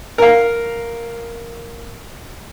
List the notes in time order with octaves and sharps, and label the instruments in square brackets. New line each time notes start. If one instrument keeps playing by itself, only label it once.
[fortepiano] A#4 F5